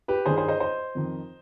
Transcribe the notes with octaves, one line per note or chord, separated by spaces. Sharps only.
G4 B4
G2 D#3 G#4 C5
G#4 C5
C5 D#5
C5 D#5
F2 D#3